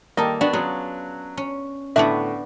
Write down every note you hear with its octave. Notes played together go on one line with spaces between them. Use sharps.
D#3 G3 A#3 A4 D#5
B3 D4 F#4
F#3 C#4 F4 G#4
C#4
A2 D3 B3 D4 F#4 E5